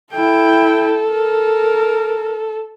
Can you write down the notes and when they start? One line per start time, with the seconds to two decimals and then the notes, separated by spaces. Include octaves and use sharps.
0.14 E4 A4 G5
1.11 A#4